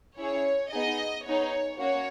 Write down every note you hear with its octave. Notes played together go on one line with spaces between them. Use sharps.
C#4 E4 G#4 C#5
B3 D#4 G#4 D#5
B3 D#4 G#4 C#5
A#3 C#4 F#4 C#5